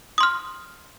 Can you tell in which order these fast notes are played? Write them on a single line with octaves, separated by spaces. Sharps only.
D#6 C6 F6